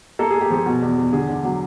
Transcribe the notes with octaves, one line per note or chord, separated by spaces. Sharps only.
A#3 A4
A#3 G#4
G4
F3 G#4
B2
E2
E2
D3 G#4
D3
F#3